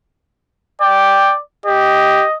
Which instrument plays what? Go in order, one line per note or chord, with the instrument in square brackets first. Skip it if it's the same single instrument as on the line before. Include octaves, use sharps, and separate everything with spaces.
[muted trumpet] D5 [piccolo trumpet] G5
[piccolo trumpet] G4 [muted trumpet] D#5